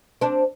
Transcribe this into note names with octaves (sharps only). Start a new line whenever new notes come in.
C4 D4